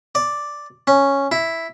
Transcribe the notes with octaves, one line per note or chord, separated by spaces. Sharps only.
D5
C#4
E4